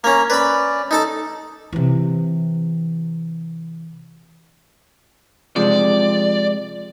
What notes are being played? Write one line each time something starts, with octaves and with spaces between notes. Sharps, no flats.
A#3 C#4 A#5
C#4 B4 D5 B5
D#4 A4 A5
C3 E3
C3 F3 G#3 D5